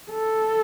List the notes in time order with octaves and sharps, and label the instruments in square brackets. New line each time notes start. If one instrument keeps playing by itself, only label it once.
[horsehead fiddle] A4